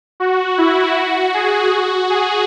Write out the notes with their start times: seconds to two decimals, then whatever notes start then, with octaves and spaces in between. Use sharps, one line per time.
0.20 F#4
0.58 E4
0.96 F#4
1.34 G#4
1.72 F#4
2.10 G#4